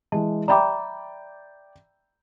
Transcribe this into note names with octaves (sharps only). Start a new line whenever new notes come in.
E3 G#3 A5
D5 E5 G5 A#5 B5 D6